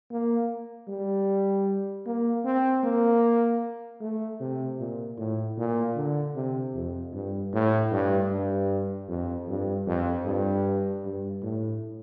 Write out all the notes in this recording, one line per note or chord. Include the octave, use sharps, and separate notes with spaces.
A#3
G3
A#3
C4
A#3
A3
C3
A#2
A2
A#2
D3
C3
F2
G2
A2
G2
G2
F2
G2
F2
G2
G2
A2